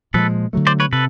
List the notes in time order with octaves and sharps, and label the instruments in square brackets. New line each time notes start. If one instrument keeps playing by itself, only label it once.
[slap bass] A#2 F3 G#3 [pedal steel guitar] A4 B4
[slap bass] D3 F#3 A3
[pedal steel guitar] C5 D5
B4 C#5
[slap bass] C3 [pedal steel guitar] A4 B4